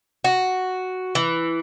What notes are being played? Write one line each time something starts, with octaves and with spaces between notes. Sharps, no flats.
F#4
E3